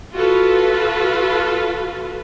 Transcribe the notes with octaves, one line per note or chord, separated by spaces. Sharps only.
F4 F#4 A4 B4